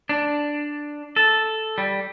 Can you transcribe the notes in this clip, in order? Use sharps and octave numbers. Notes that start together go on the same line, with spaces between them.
D4
A4
G3